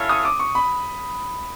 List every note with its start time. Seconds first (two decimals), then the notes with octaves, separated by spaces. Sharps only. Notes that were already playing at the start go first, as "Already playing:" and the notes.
Already playing: C#4 E4 A4 C#5 F5
0.09 D#6
0.25 D6
0.39 C#6
0.55 B5